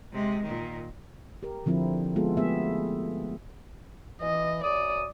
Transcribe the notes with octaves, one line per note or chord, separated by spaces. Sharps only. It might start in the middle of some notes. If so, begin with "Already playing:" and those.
C3 G#3
A#2 D#3
G4 A#4
D3 F3 C4 E4
G#3 B3 F4 G#4 A4
A3 B3 G4 G#4 E5
E3 D#5
F#2 D5 D#6